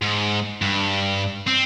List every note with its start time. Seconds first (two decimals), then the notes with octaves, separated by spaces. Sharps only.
0.02 G#2
0.62 G2
1.47 C4